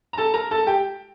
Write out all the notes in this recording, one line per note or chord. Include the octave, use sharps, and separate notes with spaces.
A#5
A4 A5
A#4 A#5
A4 A5
G4 G5